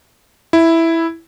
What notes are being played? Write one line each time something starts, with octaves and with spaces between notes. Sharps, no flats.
E4